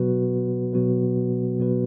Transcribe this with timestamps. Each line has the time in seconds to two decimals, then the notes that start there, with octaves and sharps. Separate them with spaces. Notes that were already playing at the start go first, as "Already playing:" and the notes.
Already playing: B2 F#3 B3 F#4 B4
0.73 B2 F#3 B3 F#4 B4
1.59 B2 F#3 B3 F#4 B4